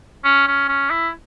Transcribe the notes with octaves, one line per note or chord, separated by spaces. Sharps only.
C#4
C#4
C#4
E4